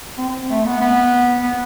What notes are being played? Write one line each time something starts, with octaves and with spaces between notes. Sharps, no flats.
C4
A3
B3
B3
B3